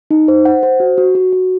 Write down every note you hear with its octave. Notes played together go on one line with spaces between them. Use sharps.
D#4
C5
F#5
C5
F#4
F#4
F#4
F#4